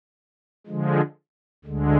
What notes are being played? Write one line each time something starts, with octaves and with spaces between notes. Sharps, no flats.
D3 F3 G#3
D2 D3 G#3